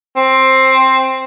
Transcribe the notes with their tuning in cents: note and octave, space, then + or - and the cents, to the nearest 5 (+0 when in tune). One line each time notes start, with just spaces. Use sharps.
C4 +10